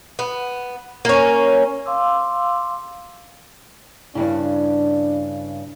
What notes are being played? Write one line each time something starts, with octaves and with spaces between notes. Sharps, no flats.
B3
A#3 C#4
F5 C6 D6 E6
G2 A#2 C#3 D4 E4